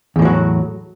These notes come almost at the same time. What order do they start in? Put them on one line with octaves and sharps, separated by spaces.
E2 A2 F3 F#3